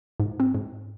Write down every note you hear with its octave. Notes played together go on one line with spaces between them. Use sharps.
G#2
C4
G#2